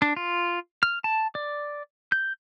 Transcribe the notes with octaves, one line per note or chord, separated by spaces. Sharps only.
D4
F4
F6
A5
D5
G6